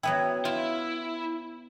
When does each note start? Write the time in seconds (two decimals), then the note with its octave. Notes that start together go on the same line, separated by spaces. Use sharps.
0.03 F#3 B3 E4 G5
0.45 E4 F4